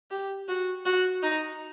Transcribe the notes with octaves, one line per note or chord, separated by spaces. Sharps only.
G4
F#4
F#4
D#4